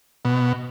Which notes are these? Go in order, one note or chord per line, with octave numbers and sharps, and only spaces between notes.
B2